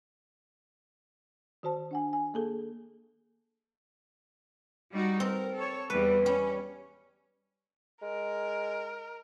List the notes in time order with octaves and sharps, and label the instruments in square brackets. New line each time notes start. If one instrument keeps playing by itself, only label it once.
[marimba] D#3 F#4 C5 A5
D4 F#5 G#5
G#5
A#3 G#4 A4
[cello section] G3 D#4 F#4
[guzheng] C4 [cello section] A#4
[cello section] A4 C#5
[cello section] E2 G3 [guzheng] B4
[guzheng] G3 [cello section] C#4
[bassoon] G#3 [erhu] A#4